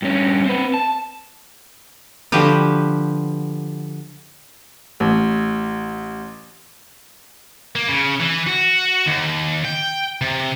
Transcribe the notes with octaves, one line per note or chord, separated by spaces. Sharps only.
G2 C#4
C4 B4
A5
D3 F3 F#4 G4 B4
A1
A#3
C#3
E3
F#4
D#2
G5
C3